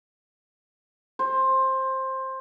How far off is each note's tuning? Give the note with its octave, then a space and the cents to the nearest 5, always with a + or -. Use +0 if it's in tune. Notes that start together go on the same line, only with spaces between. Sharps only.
C5 +15